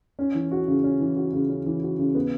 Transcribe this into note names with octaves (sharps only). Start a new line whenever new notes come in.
C#4
E3
F#4
C#3
C#4
E3
F#4
C#3
C#4
E3
F#4
C#3
B3